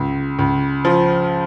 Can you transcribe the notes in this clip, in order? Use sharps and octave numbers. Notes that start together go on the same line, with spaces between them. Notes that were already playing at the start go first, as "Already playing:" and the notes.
Already playing: C#2
C#2
F3